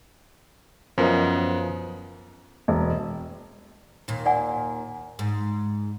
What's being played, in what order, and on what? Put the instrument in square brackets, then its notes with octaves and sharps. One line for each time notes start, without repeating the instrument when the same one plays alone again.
[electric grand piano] F#2 B3 [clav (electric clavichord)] F3 A#4 D#5
[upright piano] E1
[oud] D#2 A#2
[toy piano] D5 F#5 G#5
[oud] G#2